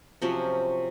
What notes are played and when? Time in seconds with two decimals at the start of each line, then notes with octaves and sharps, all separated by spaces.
0.22 C3 F3 F#3 C#4